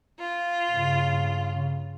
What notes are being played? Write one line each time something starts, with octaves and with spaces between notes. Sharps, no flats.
F4
G2 C#3